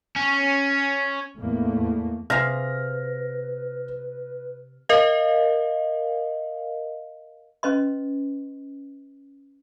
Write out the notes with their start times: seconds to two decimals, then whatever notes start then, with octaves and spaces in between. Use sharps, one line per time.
0.16 C#4
1.39 E2 A2 A3 A#3
2.30 C3 G#4 B4 F5 F6 A#6
4.89 A#4 D#5 F5
7.63 C#4 B4 D#5 C6